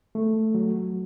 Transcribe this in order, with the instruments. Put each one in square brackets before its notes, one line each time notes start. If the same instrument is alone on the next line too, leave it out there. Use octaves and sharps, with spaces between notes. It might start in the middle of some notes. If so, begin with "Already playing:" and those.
[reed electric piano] A3
F#3